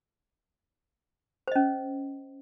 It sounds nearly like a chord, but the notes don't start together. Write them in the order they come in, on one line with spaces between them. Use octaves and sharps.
C5 D#5 C#4